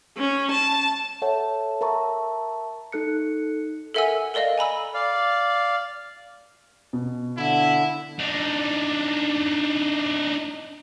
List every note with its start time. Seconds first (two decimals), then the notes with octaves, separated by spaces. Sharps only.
0.17 C#4
0.51 A5
1.22 A4 C#5 E5 F#5 A5
1.81 A#4 E5 A5 A#5 C#6
2.92 D#4 A4 F#6 C#7
3.94 A4 A#4 E5 F#5 G#5 E6
4.34 A4 A#4 D5 D#5 F5
4.58 G#5 A#5 B5 E6
4.94 D5 F5
6.93 B2
7.37 D3 E4
8.19 D4 D#4